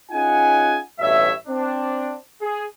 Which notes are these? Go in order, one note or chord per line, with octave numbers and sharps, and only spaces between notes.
C#4 D#4 F4 G#4 F#5 G#5
A1 G2 B2 C#5 E5
C4 D4
G#4